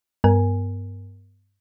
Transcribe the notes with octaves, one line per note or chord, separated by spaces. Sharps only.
G2 B3 A#4 G#5